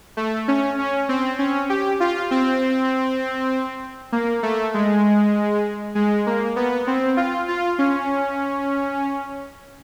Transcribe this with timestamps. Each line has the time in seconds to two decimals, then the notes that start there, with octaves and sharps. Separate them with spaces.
0.17 A3
0.48 C#4
0.79 C#4
1.09 C4
1.39 C#4
1.70 G4
2.00 F4
2.31 C4
4.12 A#3
4.43 A3
4.74 G#3
5.95 G#3
6.27 A#3
6.56 B3
6.87 C4
7.17 F4
7.48 F4
7.79 C#4